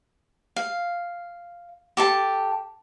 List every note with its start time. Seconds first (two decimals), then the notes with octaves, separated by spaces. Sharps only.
0.56 F5
1.97 G4 A4 A5